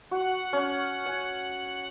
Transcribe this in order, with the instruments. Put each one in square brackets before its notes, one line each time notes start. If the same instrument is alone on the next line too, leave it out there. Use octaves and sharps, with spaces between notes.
[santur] F#4 [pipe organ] F#5
[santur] C#4
G#5